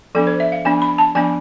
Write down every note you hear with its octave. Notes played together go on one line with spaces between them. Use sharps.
F3 B3 D4 A4
C5
E5
F5
F3 B3 D4 G#5
B5
A5
F3 B3 D4 G#5